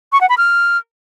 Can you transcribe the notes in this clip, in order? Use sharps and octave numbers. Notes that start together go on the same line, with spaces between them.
C#6
F#5
B5
F6